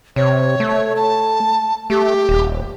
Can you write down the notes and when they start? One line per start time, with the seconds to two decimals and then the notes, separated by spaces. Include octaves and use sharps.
0.16 C3 C#5
0.60 A3
0.96 A5
1.90 A3 G4
2.29 D#1